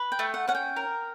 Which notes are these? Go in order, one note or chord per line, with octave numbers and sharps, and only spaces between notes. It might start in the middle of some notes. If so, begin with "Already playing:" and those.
Already playing: B4
G5
A3
F#5
C#4 F#5
G5
A#4